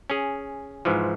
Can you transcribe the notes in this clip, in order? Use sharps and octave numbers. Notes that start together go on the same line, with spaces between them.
C#4 G#4
G#2 E3 F3